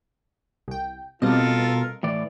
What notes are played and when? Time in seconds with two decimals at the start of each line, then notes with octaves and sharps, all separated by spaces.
0.68 C2 G5
1.22 B2 G3 C4 F4 A4 A#4 D#5
2.03 A2 E3 D5